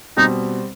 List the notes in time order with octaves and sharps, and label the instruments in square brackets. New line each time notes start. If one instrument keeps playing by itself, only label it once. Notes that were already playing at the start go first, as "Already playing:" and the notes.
[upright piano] B2 G3 C4 [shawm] D#4